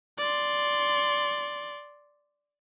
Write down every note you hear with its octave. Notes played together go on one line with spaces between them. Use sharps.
D5 C6